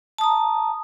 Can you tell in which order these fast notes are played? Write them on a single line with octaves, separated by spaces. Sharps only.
A5 D#6 A#5